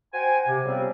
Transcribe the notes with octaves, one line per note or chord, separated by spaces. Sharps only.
F#4 C5 G5 G#5
C3
C#3 F3 G3 B3 C4